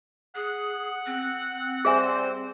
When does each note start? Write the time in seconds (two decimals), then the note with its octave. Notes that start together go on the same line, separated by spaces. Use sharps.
0.35 G#4 F#5
1.06 C4
1.85 G3 G#4 C5 E5 G#5